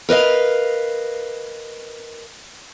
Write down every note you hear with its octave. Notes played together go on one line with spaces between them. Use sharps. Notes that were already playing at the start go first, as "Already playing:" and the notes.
A#4 B4 D#5 F5